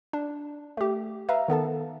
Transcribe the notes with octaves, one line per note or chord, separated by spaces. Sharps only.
D4
A3 G4
B4 E5 F5 A#5
D#3 B3 A4 A5